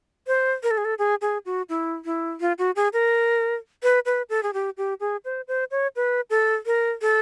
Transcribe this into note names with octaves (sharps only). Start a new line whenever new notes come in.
C5
A#4
A4
G#4
A4
G#4
G#4
F#4
E4
E4
F4
F#4
G#4
A#4
B4
B4
A4
G#4
G4
G4
G#4
C5
C5
C#5
B4
A4
A#4
A4